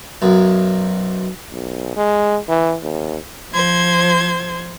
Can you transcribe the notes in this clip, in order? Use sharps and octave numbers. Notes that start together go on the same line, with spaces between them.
B1 F#2
B1
G#3
E3
D#2
F3 C5 G#6